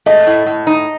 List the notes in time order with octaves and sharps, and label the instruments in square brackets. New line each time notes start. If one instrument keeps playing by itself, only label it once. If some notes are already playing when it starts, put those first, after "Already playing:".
[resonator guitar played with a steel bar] A3 [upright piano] D#5
[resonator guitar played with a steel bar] A2
A2
D#4